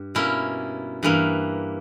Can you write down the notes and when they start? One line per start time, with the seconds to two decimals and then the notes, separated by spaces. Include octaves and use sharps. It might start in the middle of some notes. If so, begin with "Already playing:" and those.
Already playing: G2
0.15 B2 A#3 C#4 E4
1.03 G2 E3 A#3